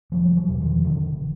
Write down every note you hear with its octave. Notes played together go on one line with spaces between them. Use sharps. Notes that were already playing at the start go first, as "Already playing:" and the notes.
F1 F3 G3
G3
E3 F#3
E2 B2
D#3 F3
F1 D3 E3